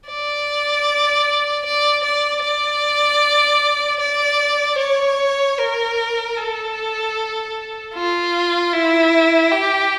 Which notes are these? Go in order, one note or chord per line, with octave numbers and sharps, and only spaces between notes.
D5
D5
D5
D5
D5
C#5
A#4
A4
F4
E4
G4